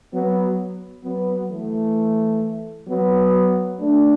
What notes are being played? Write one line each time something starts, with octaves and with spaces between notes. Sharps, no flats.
F#3 B3
F#3 B3
E3 A3
F#3 B3
A3 D4